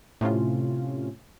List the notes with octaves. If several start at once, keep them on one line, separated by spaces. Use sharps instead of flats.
A2 C3 C#4 F4